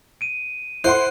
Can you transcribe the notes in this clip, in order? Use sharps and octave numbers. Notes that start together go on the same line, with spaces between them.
D7 D#7
E4 C5 F#5 C6 F#6